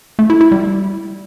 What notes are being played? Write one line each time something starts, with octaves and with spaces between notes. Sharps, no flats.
A3
E4
E4
G3